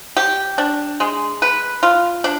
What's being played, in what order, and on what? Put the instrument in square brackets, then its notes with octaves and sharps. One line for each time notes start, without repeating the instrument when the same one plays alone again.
[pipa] G4
D4
G#3
B4
F4
D4